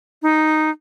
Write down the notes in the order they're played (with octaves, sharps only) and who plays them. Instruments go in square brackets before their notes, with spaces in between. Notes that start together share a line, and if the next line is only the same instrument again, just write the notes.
[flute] D#4